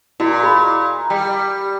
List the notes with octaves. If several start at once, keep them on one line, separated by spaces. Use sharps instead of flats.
A#2 E4 F#4 D#5
G#4 D#5 B5
G3 G5